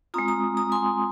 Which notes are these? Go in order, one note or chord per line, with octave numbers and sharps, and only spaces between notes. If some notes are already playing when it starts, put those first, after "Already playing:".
G#3 C4 F4 A#5 D#6
A#5 D#6
A#5 D#6
G#5 C6